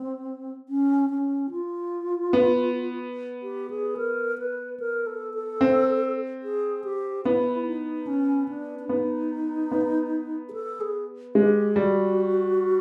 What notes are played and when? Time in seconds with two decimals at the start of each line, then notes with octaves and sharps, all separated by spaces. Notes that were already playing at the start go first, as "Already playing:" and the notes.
Already playing: C4
0.69 C#4
1.10 C#4
1.51 F4
2.33 B3
3.43 G4
3.70 G#4
3.97 A#4
4.38 B4
4.80 A#4
5.07 A4
5.34 A4
5.61 C4
6.43 G#4
6.84 G4
7.25 B3 E4
7.67 D#4
8.07 C#4
8.48 D4
8.79 D4
8.89 B3 D#4
9.71 B3
10.49 G#4
10.53 A4
10.81 G#4
11.35 G#3 G4
11.76 G3 F#4